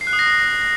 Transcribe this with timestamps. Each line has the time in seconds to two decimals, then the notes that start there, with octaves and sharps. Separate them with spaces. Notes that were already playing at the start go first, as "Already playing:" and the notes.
0.01 C7
0.07 F#6
0.13 D#6
0.19 A#6